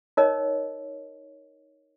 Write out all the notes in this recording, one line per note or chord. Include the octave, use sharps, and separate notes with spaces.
D#4 A#4 C#5 D#5